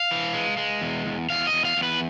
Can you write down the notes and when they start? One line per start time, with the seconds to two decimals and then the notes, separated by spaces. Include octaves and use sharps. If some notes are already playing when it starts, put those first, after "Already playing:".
Already playing: F5
0.11 E3
0.34 G#3
0.58 G#3
0.82 E2
1.06 E2
1.30 E2 F5
1.47 D#5
1.53 E2
1.65 F5
1.77 E2
1.83 B4